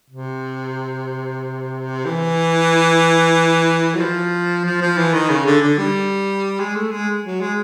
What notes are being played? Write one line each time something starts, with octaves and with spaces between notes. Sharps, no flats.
C3
E3
F#3
F3
F3
F3
E3
D#3
C#3
D3
D3
G3
G#3
A3
G#3
F#3
G#3